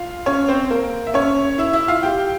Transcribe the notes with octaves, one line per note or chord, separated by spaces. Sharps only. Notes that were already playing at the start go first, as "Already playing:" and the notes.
Already playing: F4 F5
C#4 C#5
C4 C5
A#3 A#4
E5
C#4 C#5
E4 E5
E4 E5
F4 F5
G4 G5